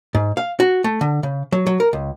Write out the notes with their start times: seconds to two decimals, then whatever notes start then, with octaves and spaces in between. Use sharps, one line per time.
0.15 G#2
0.37 F5
0.60 F#4
0.84 A3
1.01 D3
1.23 C#3
1.52 F#3
1.67 F#3
1.80 A#4
1.93 C#2